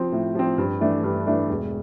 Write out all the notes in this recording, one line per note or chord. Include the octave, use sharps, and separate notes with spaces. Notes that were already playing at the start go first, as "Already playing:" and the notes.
Already playing: F3 C4
A2
F3 C4
G2
E3 A3 D4
G2
E3 A3 D4
E1